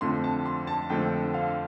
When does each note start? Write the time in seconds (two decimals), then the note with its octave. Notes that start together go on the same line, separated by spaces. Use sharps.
0.01 F2 D3 F3 A3 C4 C6
0.24 A5
0.46 C6
0.67 A5
0.90 F2 D3 F3 A3 C4 G5
1.34 F5